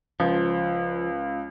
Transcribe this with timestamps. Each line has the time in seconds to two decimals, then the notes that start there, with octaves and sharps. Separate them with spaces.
0.20 C#2 F3